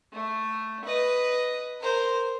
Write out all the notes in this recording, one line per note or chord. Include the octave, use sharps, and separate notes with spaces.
A3
B4 D#5
A#4 C5